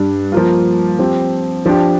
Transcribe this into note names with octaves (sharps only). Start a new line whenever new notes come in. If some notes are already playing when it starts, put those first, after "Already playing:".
Already playing: G2 G3 D4
F3 A#3 F4
F3 C4 G4
F3 D4 G4